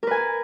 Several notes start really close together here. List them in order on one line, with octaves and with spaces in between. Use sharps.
A#4 B4 G#5